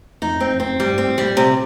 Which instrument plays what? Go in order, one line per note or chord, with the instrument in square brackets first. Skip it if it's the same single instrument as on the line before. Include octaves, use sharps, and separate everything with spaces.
[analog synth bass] F2 [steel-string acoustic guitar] D#4
[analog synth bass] F#2 [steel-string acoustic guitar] C4
[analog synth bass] F2
[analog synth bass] F#2 [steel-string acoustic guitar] C4
[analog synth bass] G2 [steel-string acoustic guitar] G3
[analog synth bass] G#2 [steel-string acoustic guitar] C4
[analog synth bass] A2
[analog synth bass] A#2 [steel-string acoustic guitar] G3
[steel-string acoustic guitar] C3